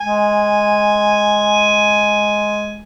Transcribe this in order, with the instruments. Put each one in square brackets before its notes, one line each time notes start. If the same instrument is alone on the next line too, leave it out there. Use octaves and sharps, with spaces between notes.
[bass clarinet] G#3 [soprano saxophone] G#5